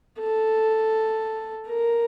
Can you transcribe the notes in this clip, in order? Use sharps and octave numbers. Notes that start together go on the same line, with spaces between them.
A4
A#4